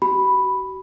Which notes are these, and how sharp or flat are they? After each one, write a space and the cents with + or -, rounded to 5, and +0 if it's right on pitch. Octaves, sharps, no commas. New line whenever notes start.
F#4 +40 B5 +0